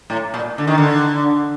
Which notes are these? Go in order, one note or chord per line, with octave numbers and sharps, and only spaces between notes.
A2
A#2
D3
D#3
D3